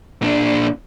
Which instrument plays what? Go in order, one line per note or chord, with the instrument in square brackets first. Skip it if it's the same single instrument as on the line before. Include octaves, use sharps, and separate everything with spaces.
[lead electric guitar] A#2 D4